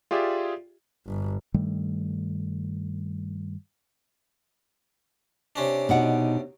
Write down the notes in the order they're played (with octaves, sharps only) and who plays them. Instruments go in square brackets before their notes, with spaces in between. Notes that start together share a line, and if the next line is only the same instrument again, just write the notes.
[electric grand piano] F4 G4 G#4 D5 E5
[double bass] G1
[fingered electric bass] G2 D#3 G3 A3
[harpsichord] C3 C#4 D4
[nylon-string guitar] B2 D#4 F#5